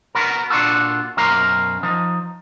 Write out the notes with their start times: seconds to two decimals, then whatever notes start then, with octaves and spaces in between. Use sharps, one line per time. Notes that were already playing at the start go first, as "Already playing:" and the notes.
0.15 B3 F#4 A#4
0.50 A#2 D4 F4 F#4 A4
1.17 F#2 B2 A#4 C5 A#5
1.83 F3 D#4